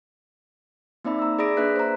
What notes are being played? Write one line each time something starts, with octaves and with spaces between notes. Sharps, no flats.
A#3 C4 D#4 D5 E5 B5
A#5 E6
G#4 D5 B5 D#6 A#6 D7
A#3 D4 B4 E5 F#6 B6
C5 A#5